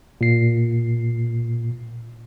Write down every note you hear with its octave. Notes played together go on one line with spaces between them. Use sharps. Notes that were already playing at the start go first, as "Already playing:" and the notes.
A#2 C7